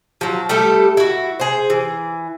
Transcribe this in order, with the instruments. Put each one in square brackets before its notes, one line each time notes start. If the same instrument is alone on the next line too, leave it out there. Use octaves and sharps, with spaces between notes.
[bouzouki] F3 F#3
G3 A3 G4 A4
E4 F#4
G#4 C5
E3